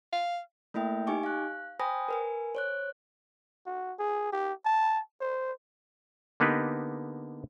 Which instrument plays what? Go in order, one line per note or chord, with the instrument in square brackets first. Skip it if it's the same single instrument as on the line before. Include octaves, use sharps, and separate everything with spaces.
[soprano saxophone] F5
[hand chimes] A3 A#3 E4 E5 G5
D#4 G4 G#5 C#6 D6
F5 F#6
C5 G5 G#5 B5 D#6 A#6
A#4 B4 G#5
C5 C#5 F#6
[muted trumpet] F#4
G#4
G4
A5
C5
[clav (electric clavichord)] D3 A#3 B3 D#4 G4 B4